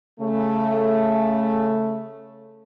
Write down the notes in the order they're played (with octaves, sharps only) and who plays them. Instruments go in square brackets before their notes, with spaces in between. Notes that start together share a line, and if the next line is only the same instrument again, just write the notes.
[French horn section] C#3 A3